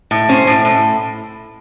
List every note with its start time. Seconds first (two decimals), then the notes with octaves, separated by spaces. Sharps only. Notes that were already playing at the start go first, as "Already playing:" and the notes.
0.11 A2
0.29 C#4 C5
0.47 A2
0.65 A2